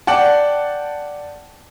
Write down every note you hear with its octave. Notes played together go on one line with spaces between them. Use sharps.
D5 F#5 G5 A5